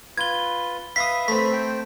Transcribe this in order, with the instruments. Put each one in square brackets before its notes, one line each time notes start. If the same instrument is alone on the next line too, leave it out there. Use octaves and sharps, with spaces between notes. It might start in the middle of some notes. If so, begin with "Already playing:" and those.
[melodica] F4 B4 [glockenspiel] G#6 G7
[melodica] B4 E5 [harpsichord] F5 D#6 [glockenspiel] B6
[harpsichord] A3 C4 [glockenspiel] B6
[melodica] C5 G5